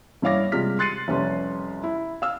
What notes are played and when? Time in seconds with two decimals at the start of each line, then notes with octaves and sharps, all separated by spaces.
0.22 G2 E4 C#5 F5 D6 A#6
0.52 C3 G3 G#3 F4 F6 B6
0.79 C6 F#6 A6 C7 C#7 D#7
1.08 C2 F2 C#4 G4 B4 C6
1.84 E4
2.22 F5 E6 F6